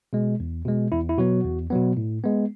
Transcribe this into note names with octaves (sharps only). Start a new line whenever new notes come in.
B2 G#3
E2
B2 G#3
E2 E4
E4
B2 F#3 B3 F#4
E2
B2 F#3 B3
A2
G#3 B3